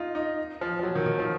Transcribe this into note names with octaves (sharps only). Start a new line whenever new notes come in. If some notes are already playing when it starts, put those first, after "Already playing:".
Already playing: D#4 F4
D#4
F3
F3
F#3
D#3
D#3
F3